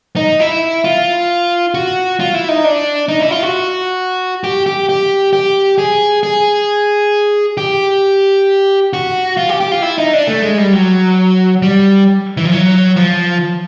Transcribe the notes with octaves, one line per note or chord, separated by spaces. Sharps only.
D#4
E4
F4
F#4
F4
E4
D#4
D4
D#4
E4
F4
F#4
G4
G4
G4
G4
G#4
G#4
G4
F#4
F4
G4
G4
F4
E4
D#4
D4
A3
G#3
G3
F#3
G3
E3
F3
F#3
F3